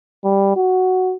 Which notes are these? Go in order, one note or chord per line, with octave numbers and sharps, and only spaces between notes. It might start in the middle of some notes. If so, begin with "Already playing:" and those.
G3
F#4